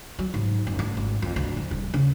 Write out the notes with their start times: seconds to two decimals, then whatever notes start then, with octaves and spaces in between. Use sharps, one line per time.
0.19 F#3
0.34 G#2
0.67 F#1
0.79 A3
0.97 G#1
1.22 F2
1.36 D2
1.57 F3
1.71 D#1
1.94 C#3